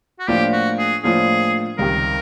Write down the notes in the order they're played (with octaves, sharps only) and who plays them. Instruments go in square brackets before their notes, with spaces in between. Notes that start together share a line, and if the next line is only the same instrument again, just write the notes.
[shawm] F#4
[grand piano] A2 F3 A#3 D4 F4 [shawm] G4
[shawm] F#4
G#4
[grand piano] A2 F3 A#3 D4 F4 [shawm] G#4
[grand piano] C#2 C3 D#3 G3 [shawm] A#4